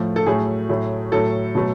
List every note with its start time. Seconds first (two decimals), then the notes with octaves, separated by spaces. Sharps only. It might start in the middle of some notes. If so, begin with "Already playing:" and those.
Already playing: A2 F3 A3
0.16 A4
0.26 A2 F#3 A3 G#4
0.69 A2 F#3 A3
1.12 A2 F#3 A3 A4
1.55 B2 F#3 A3